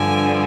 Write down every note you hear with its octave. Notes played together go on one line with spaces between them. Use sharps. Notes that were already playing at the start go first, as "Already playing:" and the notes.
Already playing: G2 D3 F3 G#5